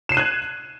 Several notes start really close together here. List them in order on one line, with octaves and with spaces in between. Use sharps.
E7 C7 D#7 F#6 G#6